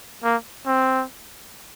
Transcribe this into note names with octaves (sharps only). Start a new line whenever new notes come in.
A#3
C4